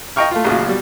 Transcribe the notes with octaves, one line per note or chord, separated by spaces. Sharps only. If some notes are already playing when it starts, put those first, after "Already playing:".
D#5 F5 G5 A#5 C#6 F6
A3 F4
A1 D#2 C#3 F#3 F4
B2 G3